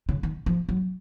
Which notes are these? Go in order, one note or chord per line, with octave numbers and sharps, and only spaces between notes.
C#3
D#3
F3
F#3